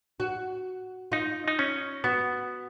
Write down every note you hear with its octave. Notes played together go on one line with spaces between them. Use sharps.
F#4
D#4 F4
D#4
C#4
B3 F#4